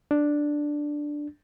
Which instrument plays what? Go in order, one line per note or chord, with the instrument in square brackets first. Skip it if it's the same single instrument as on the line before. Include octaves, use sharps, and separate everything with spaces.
[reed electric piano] D4